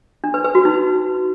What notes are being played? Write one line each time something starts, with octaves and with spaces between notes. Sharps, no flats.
D4
B4
B4
F#4
D#4